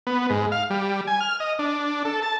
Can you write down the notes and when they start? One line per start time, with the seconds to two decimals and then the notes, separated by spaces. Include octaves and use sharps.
0.07 B3
0.30 G#2
0.52 F5
0.70 G3
1.07 G#5
1.20 F6
1.40 D#5
1.59 D4
2.05 A4
2.22 A5